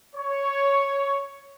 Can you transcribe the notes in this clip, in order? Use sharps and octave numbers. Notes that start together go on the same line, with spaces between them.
C#5